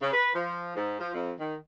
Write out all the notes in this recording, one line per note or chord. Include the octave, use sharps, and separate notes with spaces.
C#3
B4
F3
G#2
F3
F2
D#3